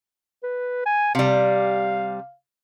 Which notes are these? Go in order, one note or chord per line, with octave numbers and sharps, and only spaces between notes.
B4
G#5
C3 G3 F5